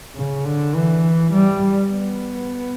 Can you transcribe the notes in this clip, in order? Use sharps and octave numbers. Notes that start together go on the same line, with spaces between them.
C#3
D3
E3
G3
B3